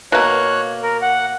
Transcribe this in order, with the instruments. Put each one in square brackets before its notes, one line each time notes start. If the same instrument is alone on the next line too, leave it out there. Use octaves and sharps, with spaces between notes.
[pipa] B2 A#3 [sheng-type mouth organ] C#5 F#6
[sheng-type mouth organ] A#4
F#5